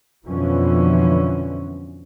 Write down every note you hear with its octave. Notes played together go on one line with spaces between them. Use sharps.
F2 B2 D3 E3 F3 C#4